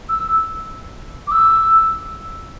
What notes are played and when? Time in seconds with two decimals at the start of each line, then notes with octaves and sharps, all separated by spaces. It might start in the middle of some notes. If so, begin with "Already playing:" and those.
0.09 E6
1.27 D6
1.31 E6